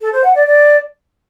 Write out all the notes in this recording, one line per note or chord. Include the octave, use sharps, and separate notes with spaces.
A4
C5
F#5
D5
D5